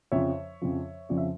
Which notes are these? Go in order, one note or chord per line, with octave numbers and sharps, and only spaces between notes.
F2 C#3 F3 C#5 E5
F2 C#3 F3
F2 C#3 F3 D5
E5